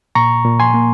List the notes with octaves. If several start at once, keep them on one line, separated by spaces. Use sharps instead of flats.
A#2 A#5 C#6
A#2
G#5 C6
A#3